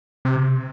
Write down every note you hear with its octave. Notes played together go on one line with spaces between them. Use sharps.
C3